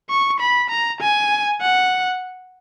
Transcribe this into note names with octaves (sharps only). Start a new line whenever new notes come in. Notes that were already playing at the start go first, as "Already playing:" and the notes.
C#6
B5
A#5
G#5
F#5